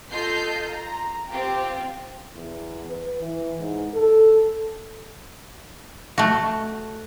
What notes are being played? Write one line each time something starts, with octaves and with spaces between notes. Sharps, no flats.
F4 A4 D#5 G6 C7
A#5
C4 F4 G4
E2
B4
E3
G#2
A4
A3 F#4